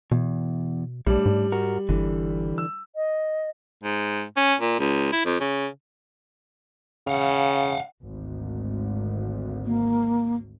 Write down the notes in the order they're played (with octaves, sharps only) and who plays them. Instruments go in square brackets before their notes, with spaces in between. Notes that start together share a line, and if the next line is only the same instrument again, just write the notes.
[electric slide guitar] E2 [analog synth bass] B2
[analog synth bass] B1 [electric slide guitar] A2 D4 [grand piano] G3
[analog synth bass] G#2
[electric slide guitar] F#4 A#4
[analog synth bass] G1 [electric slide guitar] D3 E3
[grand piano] E6
[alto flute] D#5
[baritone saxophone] G#2
C#4
A#2
C#2
E4
F2
C#3
[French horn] C#3 [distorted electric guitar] F5 F#5
[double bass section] G#1 D2
[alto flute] A#3